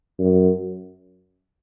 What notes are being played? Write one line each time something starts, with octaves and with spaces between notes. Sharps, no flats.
F#2